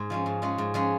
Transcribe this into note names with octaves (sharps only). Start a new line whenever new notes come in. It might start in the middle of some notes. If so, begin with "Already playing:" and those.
Already playing: G#2
F3 G#3 C#4
G#2
F3 G#3 C#4
G#2
F3 G#3 C#4